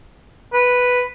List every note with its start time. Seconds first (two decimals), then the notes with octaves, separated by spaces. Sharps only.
0.53 B4